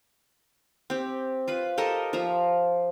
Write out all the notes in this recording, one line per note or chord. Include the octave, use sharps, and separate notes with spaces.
C4 G4
F4 B4 B5
G4 A4 A#4 D#5
F3 F4 E5 A#5